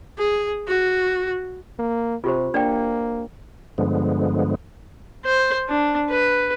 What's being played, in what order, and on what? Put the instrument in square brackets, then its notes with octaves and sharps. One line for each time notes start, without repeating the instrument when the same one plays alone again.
[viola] G#4
F#4
[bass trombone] A#3
[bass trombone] C3 [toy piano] F4 G4 C5
[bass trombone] A#3 [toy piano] D4 D5 G5
[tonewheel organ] G2 D3 F3 G#3 B3
[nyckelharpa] C5
D4
B4